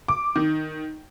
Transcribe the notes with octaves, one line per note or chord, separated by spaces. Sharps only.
D6
D#3